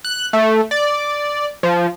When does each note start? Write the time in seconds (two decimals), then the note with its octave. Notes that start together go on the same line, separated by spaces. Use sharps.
0.04 F#6
0.33 A3
0.71 D5
1.63 F3